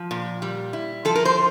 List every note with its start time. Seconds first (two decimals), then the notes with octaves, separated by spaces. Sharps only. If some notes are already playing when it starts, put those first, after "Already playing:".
Already playing: F3
0.11 A#2
0.42 G3
0.73 E4
1.05 F3 A4
1.15 A#4
1.25 C5